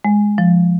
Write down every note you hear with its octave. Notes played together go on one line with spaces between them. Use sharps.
G#3
F3